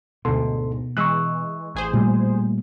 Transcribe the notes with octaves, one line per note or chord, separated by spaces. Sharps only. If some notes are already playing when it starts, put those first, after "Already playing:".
D2 G#2 B2 A4 C6
E3 G#3 C#6 E6 F#6
A1 G#4 C5
A#2 G3 A3